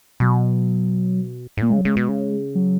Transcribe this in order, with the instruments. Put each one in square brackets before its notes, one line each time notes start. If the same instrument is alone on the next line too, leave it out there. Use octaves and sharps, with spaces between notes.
[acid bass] B2 [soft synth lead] F#3
[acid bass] G#2
[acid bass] A#2 [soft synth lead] A#3
[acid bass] C#3 [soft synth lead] G#3
[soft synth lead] F#3
[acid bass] C#3 [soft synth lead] G#3
[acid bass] B2
C#3
[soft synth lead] F#3